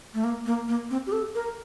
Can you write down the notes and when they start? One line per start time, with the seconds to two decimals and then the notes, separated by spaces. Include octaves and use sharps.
0.14 A3
0.24 A#3
0.46 A#3
0.68 A#3
0.91 C4
1.07 G4
1.12 A4
1.35 A#4